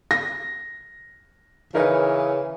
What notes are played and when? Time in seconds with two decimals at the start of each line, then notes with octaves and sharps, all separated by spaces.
0.11 A#6
1.74 C#3 E3 D#4 A#4 B4